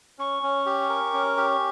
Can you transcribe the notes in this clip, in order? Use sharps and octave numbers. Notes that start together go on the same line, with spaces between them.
C#4 C#6
C#4
G4
A#4
C#4
G4